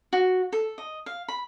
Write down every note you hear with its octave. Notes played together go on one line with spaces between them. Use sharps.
F#4
A4
D#5
F5
B5